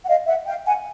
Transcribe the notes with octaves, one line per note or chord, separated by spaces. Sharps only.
F#5
D#5 F5
E5 F#5
F5 G5
F#5 G#5